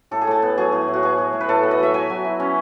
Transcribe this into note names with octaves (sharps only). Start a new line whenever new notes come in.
A2 A4
G#4
A2 A4
B3
F#3 G#4
A2
A2
F#4
B3 G#4
F#3
A2
B4
A2 A4
B3
D#5
F#3 E5
F#3 G#5
F#3
E4
C#4